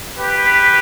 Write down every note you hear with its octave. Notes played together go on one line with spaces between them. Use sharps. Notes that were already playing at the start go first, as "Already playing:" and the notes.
G4 B4